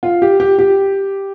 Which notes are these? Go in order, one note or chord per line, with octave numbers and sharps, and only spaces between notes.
F4
G4
G4
G4